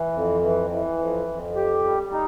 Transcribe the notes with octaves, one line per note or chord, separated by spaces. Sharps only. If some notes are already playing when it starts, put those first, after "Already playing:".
Already playing: E3
F2
E3
E3
F2
F2
G4
G3
D#4